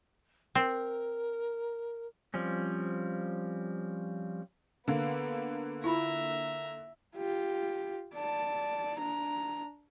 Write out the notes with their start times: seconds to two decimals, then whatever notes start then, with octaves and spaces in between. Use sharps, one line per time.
0.55 C4 A#4
2.34 F3 G3 C4 C#4
4.88 D3 A#3 B3
5.84 E4 F4 E5 A#5 B5
7.16 F4 G4
8.14 D5 A5
8.98 D4 A#5